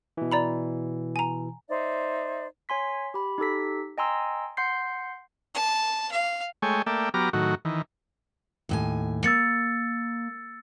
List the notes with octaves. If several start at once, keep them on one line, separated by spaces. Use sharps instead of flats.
B2 E3
D5 A#5 B5
G#5 A#5
D#4 C5 D5 E5
C#5 G#5 C6 B6
G4 B5
D#4 G4 A4 B6
D#5 G5 G#5 A#5 C6 E6
F#5 C6 G6 C7
A5
F5
G#3 A3 C#5 G5 G#5
A3 A#3 D5 E5 G5
F#3 B3 G4 A#5 D6 F6
A2 D#3 F#3 F#4
D#3 E3
D#2 A2 G#5
A#3 E6 A6 C#7